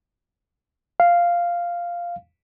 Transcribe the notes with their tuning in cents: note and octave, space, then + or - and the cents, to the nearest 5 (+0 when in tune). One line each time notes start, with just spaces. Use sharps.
F5 -5